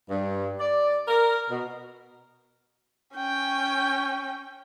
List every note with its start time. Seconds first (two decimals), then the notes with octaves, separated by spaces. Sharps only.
0.10 G2
0.60 D5
1.08 A#4
1.50 B2
3.15 C#4 G5